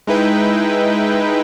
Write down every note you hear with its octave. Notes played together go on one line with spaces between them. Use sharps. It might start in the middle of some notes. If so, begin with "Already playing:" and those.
G#3 D#4 E4 B4 G5